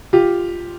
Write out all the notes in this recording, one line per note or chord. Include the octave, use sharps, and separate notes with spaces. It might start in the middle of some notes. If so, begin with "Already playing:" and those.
F4 G4